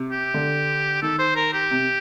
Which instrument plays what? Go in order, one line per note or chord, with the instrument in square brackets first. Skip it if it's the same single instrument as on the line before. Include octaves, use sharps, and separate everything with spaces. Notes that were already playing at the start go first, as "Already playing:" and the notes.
Already playing: [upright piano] C3
[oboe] G4
[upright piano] D3
[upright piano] D#3 [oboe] A4
[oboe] C5
A#4
G4
[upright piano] C3